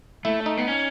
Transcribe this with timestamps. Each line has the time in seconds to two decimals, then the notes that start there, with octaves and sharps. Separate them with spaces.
0.25 A3 E4
0.46 D#4
0.57 B3
0.67 C#4